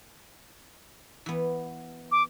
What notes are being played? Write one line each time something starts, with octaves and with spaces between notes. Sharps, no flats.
E3 B3
D6